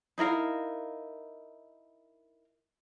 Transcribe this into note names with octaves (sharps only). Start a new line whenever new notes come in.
D#4 E4 A#4 F5